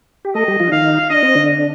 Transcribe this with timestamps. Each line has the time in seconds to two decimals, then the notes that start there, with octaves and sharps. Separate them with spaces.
0.25 G4
0.35 A3 A4 D#5
0.48 G3 G4
0.60 F3 F4
0.67 D4
0.72 D#3 D#4 F5
1.10 D4 D#5
1.23 C4
1.35 D3 D4